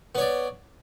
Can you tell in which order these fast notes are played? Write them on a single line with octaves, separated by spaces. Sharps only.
B3 C#5 D5